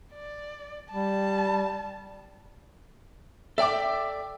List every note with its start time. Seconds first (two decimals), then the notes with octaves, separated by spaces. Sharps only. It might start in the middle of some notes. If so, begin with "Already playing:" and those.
0.14 D5
0.92 G3 A5
3.58 A4 D5 E5 G5 D6